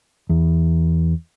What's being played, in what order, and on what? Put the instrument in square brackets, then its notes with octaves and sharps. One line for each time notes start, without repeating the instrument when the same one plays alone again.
[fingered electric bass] E2